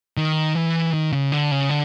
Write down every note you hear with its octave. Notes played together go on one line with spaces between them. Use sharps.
D#3
E3
D#3
C#3
D3
C#3
D3